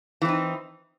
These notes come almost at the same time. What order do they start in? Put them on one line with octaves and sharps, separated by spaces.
E3 C4 D#4